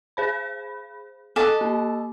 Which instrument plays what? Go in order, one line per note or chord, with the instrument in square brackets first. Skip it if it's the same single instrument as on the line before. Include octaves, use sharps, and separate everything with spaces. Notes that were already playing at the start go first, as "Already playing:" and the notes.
[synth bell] G#4 C5 B5
[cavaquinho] A4 D#5 A5 [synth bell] D6 F#6
[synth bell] A#3